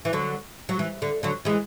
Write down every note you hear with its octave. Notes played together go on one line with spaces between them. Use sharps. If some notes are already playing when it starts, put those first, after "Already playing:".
E3
D3 F#3
F#3
E3
D3
D3 F#3
E3 G#3